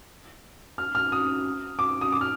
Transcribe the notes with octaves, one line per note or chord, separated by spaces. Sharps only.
F6
F6
D#6
D6
D#6
D6
F6